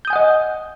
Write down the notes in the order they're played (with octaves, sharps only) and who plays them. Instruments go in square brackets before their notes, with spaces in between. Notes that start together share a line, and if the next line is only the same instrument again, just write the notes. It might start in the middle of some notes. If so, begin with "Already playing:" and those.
[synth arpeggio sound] G6
D#6
G#5
F#5
D#5